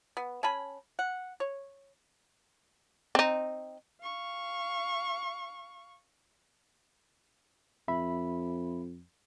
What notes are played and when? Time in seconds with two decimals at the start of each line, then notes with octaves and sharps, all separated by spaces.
0.17 B3
0.43 C#4 G#5 A5 B5
0.99 F#5
1.40 C#5
3.15 C4 D#4
4.02 F5 C#6
7.88 F2 E5 B5